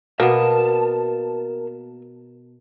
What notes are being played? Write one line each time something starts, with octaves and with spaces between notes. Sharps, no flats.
B2 A#3 B3 A#4 A5